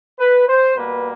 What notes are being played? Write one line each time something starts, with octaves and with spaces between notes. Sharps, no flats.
B4
C5
B2 G3 A#3 B4